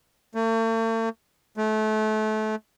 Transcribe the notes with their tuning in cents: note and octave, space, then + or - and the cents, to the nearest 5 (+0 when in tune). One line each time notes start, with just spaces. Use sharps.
A3 +45
A3 -25